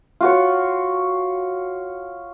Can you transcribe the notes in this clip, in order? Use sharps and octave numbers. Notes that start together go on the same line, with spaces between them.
F4 F#4 C#5